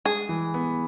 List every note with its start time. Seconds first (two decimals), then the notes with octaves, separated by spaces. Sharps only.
0.05 G#3 G#4
0.29 E3
0.54 B3